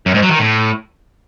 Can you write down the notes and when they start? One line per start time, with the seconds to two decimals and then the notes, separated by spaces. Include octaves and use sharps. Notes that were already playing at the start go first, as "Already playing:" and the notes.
0.06 F#2
0.14 G#2
0.23 F#3
0.31 D#3
0.39 A2